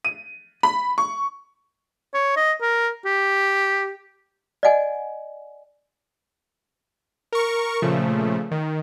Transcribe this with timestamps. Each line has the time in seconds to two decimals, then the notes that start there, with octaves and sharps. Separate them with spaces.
0.05 D#7
0.63 B5
0.98 C#6
2.14 C#5
2.37 D#5
2.62 A#4
3.06 G4
4.63 D5 D#5 F#5 G#5
7.32 A#4 C#6
7.82 A#2 C#3 F3 A3
8.51 D#3